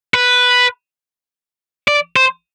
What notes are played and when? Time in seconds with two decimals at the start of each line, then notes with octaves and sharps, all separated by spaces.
0.14 B4
1.88 D5
2.16 C5